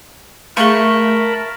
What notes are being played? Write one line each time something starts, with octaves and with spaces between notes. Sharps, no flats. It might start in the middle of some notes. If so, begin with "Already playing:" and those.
A3 G#4 A#4 F5 A5 B5 C#6